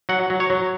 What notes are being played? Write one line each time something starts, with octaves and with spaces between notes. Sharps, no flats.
F#3 F#5
F#3
C#5
F#3